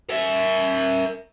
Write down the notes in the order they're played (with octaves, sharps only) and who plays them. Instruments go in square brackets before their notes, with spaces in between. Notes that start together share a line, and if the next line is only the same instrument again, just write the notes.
[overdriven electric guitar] A#4 E5